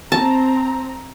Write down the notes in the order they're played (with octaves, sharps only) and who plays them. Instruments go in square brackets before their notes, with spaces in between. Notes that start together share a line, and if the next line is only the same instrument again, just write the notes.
[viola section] C4 A#5 [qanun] A5